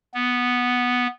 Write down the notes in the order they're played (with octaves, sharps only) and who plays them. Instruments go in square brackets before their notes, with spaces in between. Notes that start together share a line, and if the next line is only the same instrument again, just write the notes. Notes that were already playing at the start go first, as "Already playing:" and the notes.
[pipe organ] B3